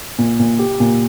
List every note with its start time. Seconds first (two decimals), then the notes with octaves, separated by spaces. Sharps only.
0.18 A#2
0.39 A#2
0.59 G4
0.80 A#2